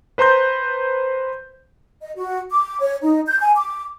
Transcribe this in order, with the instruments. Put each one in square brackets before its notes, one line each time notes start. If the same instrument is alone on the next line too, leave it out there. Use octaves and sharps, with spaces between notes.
[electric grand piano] B4 C5 A#5 C6 G6
[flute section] D#5
F#4
D6
C#5
D#4
G6
G#5
D6